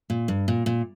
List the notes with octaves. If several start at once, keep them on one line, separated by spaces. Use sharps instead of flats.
A#2
G2
A#2
A#2